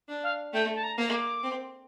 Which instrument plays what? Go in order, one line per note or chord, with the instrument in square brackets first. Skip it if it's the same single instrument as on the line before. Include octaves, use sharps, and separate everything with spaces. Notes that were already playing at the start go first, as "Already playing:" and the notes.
[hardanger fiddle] D4
[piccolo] F5
[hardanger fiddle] A3 [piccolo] G5
[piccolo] A5
A#5
[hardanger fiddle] A#3
[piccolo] D6
[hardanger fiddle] C4